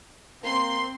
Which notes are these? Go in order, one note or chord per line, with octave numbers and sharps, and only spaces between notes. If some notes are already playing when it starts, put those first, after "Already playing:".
A#3 C4 C6